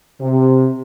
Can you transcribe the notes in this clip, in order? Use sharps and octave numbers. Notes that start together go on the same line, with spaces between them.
C3